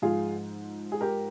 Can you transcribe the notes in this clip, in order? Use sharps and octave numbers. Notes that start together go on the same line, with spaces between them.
G#2 F3 F4 G#4
G#4
G4 A#4